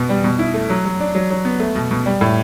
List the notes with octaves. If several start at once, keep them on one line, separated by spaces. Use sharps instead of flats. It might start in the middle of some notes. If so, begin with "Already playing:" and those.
Already playing: B2 B3
G3
B2
E4
A3
F#3
F#3
D4
F#3
F#3
B3
A3
B2
B2
G3
A2